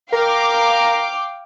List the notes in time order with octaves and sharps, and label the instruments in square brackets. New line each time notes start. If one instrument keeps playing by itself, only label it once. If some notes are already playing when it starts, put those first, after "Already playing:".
[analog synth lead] A#4 [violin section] F5 G5 D6